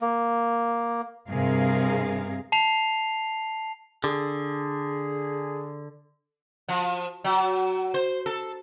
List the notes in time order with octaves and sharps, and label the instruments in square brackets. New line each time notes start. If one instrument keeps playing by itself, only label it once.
[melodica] A#3
[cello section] G2 C3 G#4 A#4 F5
[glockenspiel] A5 C7 F7
[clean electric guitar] D3 [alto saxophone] G#4
[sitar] F3
F#3
C5
A4